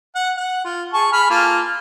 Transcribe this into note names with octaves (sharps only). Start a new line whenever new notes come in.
F#5
F#5
F4
G#4 A5 C#6
G#4 B5 F6
A#3 F4 A4